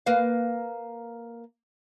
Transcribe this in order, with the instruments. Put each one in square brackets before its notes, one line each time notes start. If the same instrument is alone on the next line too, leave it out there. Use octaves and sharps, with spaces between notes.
[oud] A#3 B4 F5